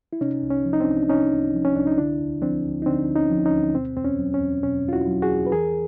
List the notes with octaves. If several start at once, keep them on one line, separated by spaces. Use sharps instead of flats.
E4
C3 C#4 D#4
C2
C#4
F3
D#4
C4 D4
C2
D4
C3 C#4 D#4
C2
F3
C#4
C2 D4
D#4
D3 D4 E4
D2
F3 C4 D4
D2
D#4
D3 C4 D4
D2
C#4 D#4
F3
C#4 D#4
D2
B2 C4
E2 C4
C#4
F#3
C#4
E2
B2 C#4
E2 F4
E4 F#4
F#3
F#4 G#4
E2
B4
E3 G#4 A#4